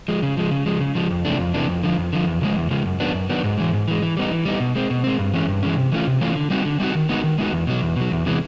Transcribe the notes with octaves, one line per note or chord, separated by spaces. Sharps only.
F3 G#3
C#3
F3 G#3
C#3
F3 G#3
C#3
F3 G#3
F2
C3 E3 A3 D4
F2
C3 E3 A3 D4
F2
D3 F3
F2
D3 F3
E2
C#3 F3 G#3
E2
C#3 F3 G#3
F#2
D#3 F#3 B3 D4
F#2
D#3 F#3 B3 D4
G#2
E3 G#3
G#2
E3 G#3
E3
G3 B3 D#4
E3
G3 B3 D#4
B2
G#3 C4
B2
G#3 C4
G2
E3 G#3 C#4
G2
E3 G#3 C#4
C3
E3 A3 C#4 F4
C3
E3 A3 C#4 F4
D3
G3 C4 D#4 F#4
D3
G3 C4 D#4 F#4
D#3
G#3 B3 D#4 F#4
D#3
G#3 B3 D#4 F#4
E2
B2 F#3
E2
B2 F#3
E2
C3 E3 G#3 B3